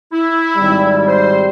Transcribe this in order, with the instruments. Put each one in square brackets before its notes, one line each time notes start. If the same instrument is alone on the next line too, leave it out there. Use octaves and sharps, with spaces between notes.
[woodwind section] E4
[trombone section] G#1 G3
[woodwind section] C5